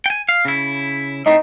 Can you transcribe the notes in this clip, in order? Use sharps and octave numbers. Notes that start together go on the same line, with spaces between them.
G5 G#5
F5
C#3 E4
A2 A3 C4 D#4